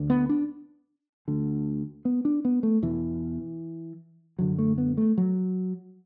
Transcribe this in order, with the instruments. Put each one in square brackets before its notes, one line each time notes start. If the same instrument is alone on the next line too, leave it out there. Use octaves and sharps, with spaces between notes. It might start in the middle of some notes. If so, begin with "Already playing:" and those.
Already playing: [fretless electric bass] D2 D3
B3
D4
D2 D3
B3
D4
B3
A3
E2 B2 E3
F#2 D3 F#3
A3
B3
A3
F#3